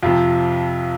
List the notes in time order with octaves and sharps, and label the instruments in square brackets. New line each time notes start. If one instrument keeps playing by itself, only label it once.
[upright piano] F2 C3 F3 F4